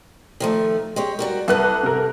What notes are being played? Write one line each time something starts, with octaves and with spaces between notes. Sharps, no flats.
D#3 F3 A3
G#3 G4 C#5
G3 F#4 A#4
C2 A4 B4 F#5 A5 F#6
C3 A#4